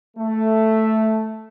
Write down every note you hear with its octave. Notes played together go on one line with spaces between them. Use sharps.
A3